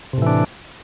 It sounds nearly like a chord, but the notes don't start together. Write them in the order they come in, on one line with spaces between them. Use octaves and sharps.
C3 A2 E3 D4